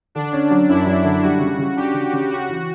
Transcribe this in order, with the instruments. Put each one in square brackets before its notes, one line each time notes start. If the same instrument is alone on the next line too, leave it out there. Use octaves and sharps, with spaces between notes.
[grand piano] D3 [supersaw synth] D4
[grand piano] C#4
F#3
[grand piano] F#2 [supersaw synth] E4
[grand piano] F#3
D3
[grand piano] G3 [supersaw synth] F#4
[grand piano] C#3
C#3
[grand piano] D4 [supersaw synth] G4
[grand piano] C#3
C#3
[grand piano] C#4 [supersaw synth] F#4
[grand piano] E3